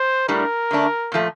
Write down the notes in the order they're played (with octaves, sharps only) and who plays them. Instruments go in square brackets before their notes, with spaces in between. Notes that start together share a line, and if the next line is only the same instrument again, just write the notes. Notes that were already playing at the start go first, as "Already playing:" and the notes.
Already playing: [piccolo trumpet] C5
[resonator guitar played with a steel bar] A2 G3 D4 [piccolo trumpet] A#4
[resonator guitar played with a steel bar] D3 A3 D4
A#2 F3 A3